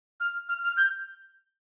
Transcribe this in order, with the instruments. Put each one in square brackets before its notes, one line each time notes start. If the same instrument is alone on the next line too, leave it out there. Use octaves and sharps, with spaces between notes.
[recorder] F6
F6
F6
G6